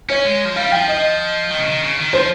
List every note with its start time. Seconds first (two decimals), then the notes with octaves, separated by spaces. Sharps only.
0.09 C#4 C#5
0.25 G#3
0.45 F3
0.56 G3 F5
0.71 F3 G5
0.88 D#5
1.51 D#3
1.59 C#3
1.66 D#3
1.81 C#3
1.97 D#3
2.13 F3 C5